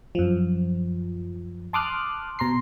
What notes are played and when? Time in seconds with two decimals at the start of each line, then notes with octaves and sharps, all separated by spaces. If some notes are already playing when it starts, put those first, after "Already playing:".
0.15 F#2 F3
1.73 A5 C6 D6 D#6 F6 F#6
2.39 B2 A#5 C6 C7